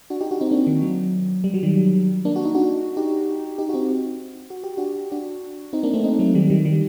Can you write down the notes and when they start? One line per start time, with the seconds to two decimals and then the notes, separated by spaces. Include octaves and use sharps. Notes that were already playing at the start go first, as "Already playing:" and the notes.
0.10 D4 F#4
0.21 D#4 G4
0.31 D4 F#4
0.41 C4 D#4
0.51 A#3 D4
0.67 D#3
0.82 F#3
1.44 G3
1.54 F#3
1.63 D#3 G3
2.25 A#3 D4
2.36 F#4
2.45 D#4
2.55 D4 F#4
2.97 D#4 G4
3.58 D#4 G4
3.69 F#4
3.74 C4 D#4
4.50 F#4
4.64 G4
4.77 D4 F#4
5.12 D4 F#4
5.73 C4 D#4
5.83 A#3 D4
5.93 A3 C4
6.04 C4 D#4
6.19 F#3 A3
6.35 D#3 G3
6.50 D#3 G3
6.65 D#3 G3